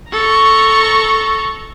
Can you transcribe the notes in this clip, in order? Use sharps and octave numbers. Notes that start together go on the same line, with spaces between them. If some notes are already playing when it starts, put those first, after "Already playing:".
A4 A#5 C#6